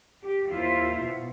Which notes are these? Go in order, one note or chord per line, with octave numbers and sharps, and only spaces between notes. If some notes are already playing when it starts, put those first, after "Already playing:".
G4
D#2 E4 F4 C5 E5
B2